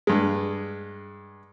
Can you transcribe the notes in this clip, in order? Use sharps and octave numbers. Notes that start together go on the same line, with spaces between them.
G2 G#3